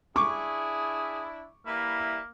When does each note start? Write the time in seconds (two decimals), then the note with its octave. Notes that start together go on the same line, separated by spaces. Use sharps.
0.16 D4 E4 G#4 C#6 D6
1.66 E3 G3 A#3 E4